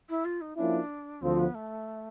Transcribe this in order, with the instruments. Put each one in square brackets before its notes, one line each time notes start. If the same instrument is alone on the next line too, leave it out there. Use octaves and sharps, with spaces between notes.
[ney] E4
F4
D#4
[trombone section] F3 A#3 C#4 E4 [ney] D4
[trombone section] D2 D3 F3 [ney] C4
[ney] B3
A3